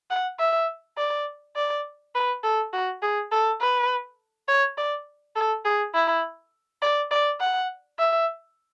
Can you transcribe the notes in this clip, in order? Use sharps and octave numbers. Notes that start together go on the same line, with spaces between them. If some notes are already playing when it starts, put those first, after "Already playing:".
F#5
E5
D5
D5
B4
A4
F#4
G#4
A4
B4
C#5
D5
A4
G#4
E4
D5
D5
F#5
E5